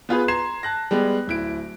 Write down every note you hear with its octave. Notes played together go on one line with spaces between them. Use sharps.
B3 F4 G#4 B4
A#5 C6 G#6 C7 E7
A5 F#6 A#6
G3 G#3 B3
D1 E4 D7